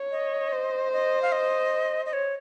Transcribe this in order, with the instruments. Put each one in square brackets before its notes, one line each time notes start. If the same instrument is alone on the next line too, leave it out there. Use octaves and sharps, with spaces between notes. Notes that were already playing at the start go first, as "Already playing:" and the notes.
Already playing: [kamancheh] C#5
[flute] D#5
[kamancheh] C5
[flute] D#5
F5
D#5
D#5
C#5